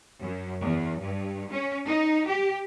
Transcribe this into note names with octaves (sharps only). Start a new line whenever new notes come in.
F#2
E2
G2
C#4
D#4
G4